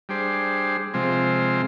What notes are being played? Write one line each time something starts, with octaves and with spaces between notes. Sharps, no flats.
G3 D4 G#4 C5
C3 F3 G#3 C4